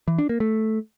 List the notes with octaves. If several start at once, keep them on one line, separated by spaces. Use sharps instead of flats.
E3
D4
A#3
A3